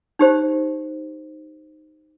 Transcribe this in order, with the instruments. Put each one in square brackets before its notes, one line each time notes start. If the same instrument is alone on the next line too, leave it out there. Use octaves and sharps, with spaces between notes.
[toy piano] D#4 G4 C5